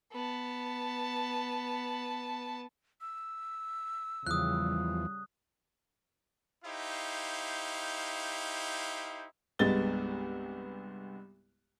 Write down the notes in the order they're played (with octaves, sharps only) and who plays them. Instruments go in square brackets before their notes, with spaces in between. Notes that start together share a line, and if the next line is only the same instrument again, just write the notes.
[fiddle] B3 A5
[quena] E6
[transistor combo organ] E2 F3 [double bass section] C#3 G3 [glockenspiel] D#6 F#6
[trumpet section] D#4 E4 G4 C5 F5
[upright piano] C2 G2 G#3 B3 A6 G7